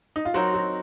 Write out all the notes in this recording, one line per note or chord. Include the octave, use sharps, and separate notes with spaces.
D#4
F4
F#3 C4 D#4 F#4 A#4
F#3 F#4